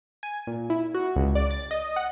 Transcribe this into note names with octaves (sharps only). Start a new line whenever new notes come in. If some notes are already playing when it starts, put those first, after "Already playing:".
G#5
A#2
E4
F#4
C#2
D5
A6
D#5
F#5